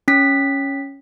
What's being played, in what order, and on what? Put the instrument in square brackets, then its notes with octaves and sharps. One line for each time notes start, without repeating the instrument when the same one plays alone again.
[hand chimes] C#4 B6